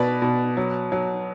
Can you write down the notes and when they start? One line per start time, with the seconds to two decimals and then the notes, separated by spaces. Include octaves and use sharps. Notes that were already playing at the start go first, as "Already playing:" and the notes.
Already playing: B2 B4 D5
0.22 B2
0.57 F#3
0.92 F#3